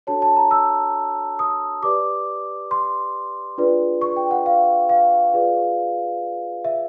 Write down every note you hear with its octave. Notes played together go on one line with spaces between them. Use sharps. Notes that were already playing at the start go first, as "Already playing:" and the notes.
D4 F#4 A4 C#5 A5
A5
A#5
E6
D#6
G4 B4 D5 D6
C6
D4 F4 G#4 B4 D5
C#6
G5
F#5
F5
F5
F4 G#4 B4 D5
E5